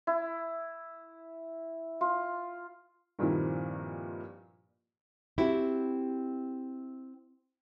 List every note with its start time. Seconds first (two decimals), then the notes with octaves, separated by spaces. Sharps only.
0.07 E4
2.01 F4
3.19 G2 A#2 D#3 F3 C4 E4
5.38 C4 E4 F#4 G4